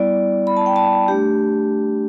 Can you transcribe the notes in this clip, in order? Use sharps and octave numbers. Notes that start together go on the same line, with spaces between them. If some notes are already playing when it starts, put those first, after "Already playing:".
Already playing: G3 B3 E4 D5
B5
A5
G5
A5
A3 D4 G4